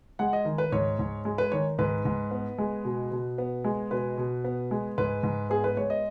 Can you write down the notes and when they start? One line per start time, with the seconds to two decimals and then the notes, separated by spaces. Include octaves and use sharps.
0.19 G#3 F#5
0.33 D#5
0.45 D#3
0.58 B4
0.72 G#2 C#5
0.99 G#2
1.25 G#3
1.38 B4
1.52 D#3 C#5
1.78 G#2 B4
2.05 G#2
2.31 B3
2.58 G#3
2.84 B2
3.11 B2
3.38 B3
3.64 G#3
3.91 B2 B4
4.18 B2
4.44 B3
4.71 G#3
4.98 G#2 B4
5.23 G#2
5.50 B3 G#4
5.64 B4
5.77 G#3 C#5
5.90 D#5